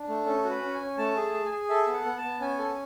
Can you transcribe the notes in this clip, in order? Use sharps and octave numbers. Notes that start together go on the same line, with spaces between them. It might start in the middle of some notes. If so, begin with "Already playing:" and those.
Already playing: D4
A3
C#4 A4
F#4
B4
C#4
G#5
C#4
A3 A5
G#4
A5
G#4
G#5
G#4
A4 E5
B3
F#5
B3
A5
B3
C#4 G#5
A4